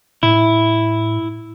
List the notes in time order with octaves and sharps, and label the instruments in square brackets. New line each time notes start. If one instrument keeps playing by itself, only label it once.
[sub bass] A2 [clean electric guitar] E4